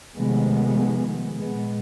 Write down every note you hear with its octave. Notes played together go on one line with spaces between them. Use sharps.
C3 D#3 F3 G#3 A3 B3
A#2 G#3 B3